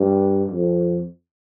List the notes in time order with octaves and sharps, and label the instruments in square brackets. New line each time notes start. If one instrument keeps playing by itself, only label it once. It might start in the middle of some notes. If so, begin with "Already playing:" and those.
Already playing: [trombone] G2
F2